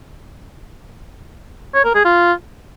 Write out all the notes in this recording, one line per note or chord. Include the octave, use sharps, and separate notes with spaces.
C#5
A#4
G#4
F4